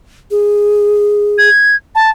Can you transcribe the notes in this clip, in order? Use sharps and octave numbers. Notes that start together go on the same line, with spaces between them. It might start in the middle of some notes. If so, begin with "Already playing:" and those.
G#4
G#6
A5